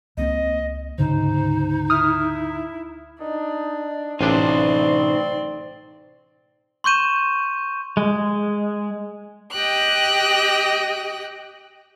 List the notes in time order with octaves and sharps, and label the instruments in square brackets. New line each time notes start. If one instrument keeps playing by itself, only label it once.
[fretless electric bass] C#2 A#3 C4 [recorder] D#5
[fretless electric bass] D2 G#2 C#3 [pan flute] D#4 [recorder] C5
[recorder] E4 [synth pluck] D#6 F6
[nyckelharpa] D4 [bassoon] D#4
[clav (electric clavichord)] A1 D4 [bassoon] C4 [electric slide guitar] D#4 B4 [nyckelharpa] D5 C6
[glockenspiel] C6 C#6 G6 D#7 E7
[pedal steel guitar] G#3
[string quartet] G4 D#5 G5 F#6